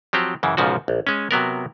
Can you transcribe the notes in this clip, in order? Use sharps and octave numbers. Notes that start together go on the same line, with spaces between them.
F3 F#3 C4 G4
F#2 C#3 E3
B1 G#2 C#3 F3 F#4
A#1
G#3 C#4
C3 F#3 B3 A#4